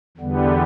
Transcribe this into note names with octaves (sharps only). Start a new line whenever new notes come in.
E2 D3 G3 B3